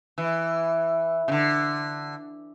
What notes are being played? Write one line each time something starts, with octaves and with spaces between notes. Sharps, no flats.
E3
C#3
D3